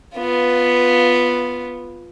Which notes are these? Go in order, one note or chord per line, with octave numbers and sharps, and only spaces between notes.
B3 F4